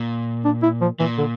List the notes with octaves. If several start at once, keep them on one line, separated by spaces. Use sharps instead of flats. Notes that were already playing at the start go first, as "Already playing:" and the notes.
Already playing: A#2
D4
E4
F3
A#2 E3
D3